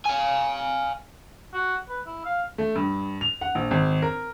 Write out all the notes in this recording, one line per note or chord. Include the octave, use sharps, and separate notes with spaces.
F5 G#5
F#4
B4
E4
F5
A3
G2
F7
F#5
A#1
G#1
A#4